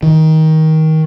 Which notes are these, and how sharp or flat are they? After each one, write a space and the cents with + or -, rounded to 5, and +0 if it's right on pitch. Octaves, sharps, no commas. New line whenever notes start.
D#3 +20